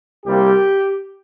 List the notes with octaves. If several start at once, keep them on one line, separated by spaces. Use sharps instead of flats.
C2 C3 G3 A#3 G4